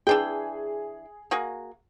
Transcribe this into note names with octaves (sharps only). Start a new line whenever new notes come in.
E3 D4 G#4 G5
A#3 F#4 G#4